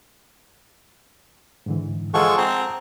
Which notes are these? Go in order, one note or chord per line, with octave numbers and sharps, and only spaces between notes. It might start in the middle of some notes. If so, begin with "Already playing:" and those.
G#2 D3 E3
F3 G#3 A4 F#5 G#5 C#6 G#6
C4 A#5